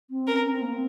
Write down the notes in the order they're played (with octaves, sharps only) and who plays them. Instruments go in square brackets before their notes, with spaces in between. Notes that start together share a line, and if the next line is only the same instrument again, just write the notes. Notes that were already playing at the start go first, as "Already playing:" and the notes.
[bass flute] C4
[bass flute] C#4 [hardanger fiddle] A#4
[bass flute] C#4
C4
A#3
C4